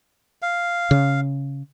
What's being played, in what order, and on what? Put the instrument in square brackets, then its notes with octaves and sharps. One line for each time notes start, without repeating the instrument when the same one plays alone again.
[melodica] F5
[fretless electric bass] C#3